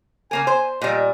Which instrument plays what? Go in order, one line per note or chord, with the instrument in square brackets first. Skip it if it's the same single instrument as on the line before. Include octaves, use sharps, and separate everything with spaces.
[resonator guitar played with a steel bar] C#3 A#3 A#4 [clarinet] G#5
[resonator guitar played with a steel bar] C5
[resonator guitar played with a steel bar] A#2 G3 [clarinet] D#5